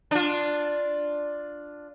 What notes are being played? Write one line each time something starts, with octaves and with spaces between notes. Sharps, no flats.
D4 F4